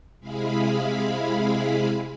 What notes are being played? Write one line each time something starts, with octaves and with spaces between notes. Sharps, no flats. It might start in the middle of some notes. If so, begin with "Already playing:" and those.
C3 G#3 E4 G#4 F5 B5